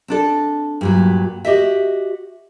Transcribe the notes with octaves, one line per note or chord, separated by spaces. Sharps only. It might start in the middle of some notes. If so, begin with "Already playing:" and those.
C4 D4 A4
G2 A#2 F#3
F#4 G4 D#5 E5